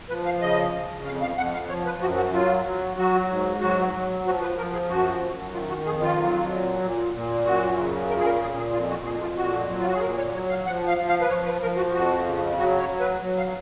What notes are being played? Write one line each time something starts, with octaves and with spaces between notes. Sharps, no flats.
F3 B4
F5
C#3 D#5
C#3
F2 F5
F5
F2 F#5
F5
F3 C#5
B4
F#2 F#4
F#4
F#3 F4
F#3
F#3 F#4
G#2
F#3 F#4
F#3
F3 F#4
B4
F3 A#4
G#4
F#2 F#4
F#2
D#3 F4
F#4
F2 G#4
F4
F#3
A#2
A#2
A#2
F#2 F#4
C#3
A#2 A#4
G#4
A#4
A#2 G#4
G#4
F2 F4
F#4
F2 G#4
F4
A#2 F#4
F#3
F4
F#4
G#4
A#2 A#4
C#5
F#3 C#5
F5
F3 F#5
F5
F3
F5
B4
F3 C#5
B4
F3 A#4
F#4
F2 F#4
C#3
F#3 F#4
C#5
F#3
B4
F#3
F5